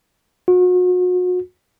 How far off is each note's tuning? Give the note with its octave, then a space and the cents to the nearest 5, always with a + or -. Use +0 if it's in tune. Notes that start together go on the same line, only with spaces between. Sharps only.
F#4 -35